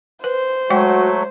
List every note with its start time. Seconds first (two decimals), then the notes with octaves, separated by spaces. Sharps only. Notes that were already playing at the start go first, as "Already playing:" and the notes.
0.24 B4 C5
0.70 F#3 G#3 A3 F#4 F#5 G5